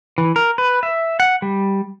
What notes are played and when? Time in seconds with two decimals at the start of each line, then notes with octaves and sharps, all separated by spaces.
0.18 E3
0.36 A#4
0.58 B4
0.83 E5
1.20 F#5
1.42 G3